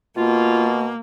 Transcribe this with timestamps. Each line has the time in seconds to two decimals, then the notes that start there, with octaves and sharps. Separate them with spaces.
0.17 B2 A#3 F4